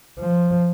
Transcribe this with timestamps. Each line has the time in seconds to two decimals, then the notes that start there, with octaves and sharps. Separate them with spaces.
0.19 F3